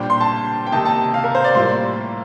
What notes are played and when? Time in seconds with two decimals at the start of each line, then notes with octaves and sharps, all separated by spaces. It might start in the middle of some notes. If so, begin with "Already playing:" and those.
Already playing: A#2 G3 D4 G4 C5
0.10 C6
0.20 A5
0.67 G5
0.72 C3 D#3 A#3 D#4 A5
0.85 A5
1.14 F5
1.24 A#4
1.35 C5
1.44 D5
1.55 A2 G3 A#3 F4 C6